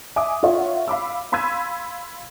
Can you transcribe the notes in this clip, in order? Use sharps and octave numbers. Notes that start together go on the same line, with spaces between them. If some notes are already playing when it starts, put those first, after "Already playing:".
E5 G#5 D6 D#6
F4 C#5 E5 F#5
F5 B5 D6 E6
F5 B5 C6 E6 G#6 D#7